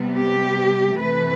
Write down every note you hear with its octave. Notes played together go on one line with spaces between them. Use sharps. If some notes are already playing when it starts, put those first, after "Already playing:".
Already playing: C3 G3 B3
G4
C3 E3 A3 B4